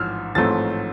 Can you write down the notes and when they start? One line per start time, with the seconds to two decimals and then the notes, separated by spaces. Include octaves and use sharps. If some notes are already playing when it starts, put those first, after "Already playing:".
Already playing: A1 G#2 F3 E6 F6
0.35 A1 G#2 F3 A3 C4 A6